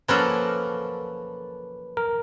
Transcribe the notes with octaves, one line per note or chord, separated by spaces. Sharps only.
F3 A#3 C#4 F#4 A4 B4
A#4